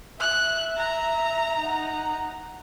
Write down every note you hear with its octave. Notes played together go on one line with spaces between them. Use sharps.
E5 F#6
A#5
D#4 F#5